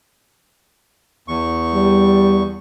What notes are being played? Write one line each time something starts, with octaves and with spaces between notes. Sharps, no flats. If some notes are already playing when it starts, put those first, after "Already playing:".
E2 C#6
G3